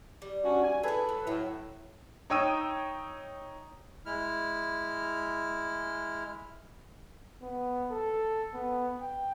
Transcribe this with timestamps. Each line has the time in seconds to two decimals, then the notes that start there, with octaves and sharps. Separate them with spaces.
0.22 G3
0.44 C#4 D4 F#4
0.64 G#5
0.83 E4 G#4 A4 B4
1.09 F#3
1.27 A2 F#3 E5
2.30 D#4 C#5 G5 D#6 E6 D#7
4.06 G#3 E4 F6
7.42 B3
7.91 A4
8.54 B3
9.01 G5